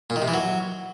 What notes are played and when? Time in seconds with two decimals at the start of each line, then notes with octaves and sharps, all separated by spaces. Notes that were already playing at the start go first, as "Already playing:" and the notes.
0.10 A#2
0.16 D#3
0.22 C3
0.28 E3
0.34 F#3